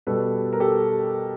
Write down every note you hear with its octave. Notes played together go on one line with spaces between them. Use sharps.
B2 G3 A4 B4
A#4
G4 A4